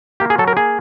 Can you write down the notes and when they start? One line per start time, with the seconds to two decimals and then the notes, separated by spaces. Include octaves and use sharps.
0.20 A#3 G4
0.30 G#4
0.38 F#3 A4
0.48 A#4
0.57 A#3 G#4